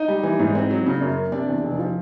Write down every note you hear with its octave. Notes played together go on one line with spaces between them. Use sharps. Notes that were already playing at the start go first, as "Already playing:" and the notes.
Already playing: D#4 D#5
G3
E3
G#2
C4
F#3
C#3
F#2
A#3
C3 D4 D5
E2
F1
F3